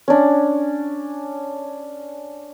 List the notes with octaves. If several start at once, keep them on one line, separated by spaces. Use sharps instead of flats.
C#4 D4